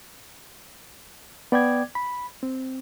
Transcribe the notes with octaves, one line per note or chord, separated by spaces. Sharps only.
B3 D5 G5 D6 G#6
B5
C4